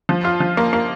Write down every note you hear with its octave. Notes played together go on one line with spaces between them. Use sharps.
F3
F4
F3
A#3
A#3